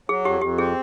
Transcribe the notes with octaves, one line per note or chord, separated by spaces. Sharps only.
F#3 G#4
F2 G4
F2 G4
C4 G#4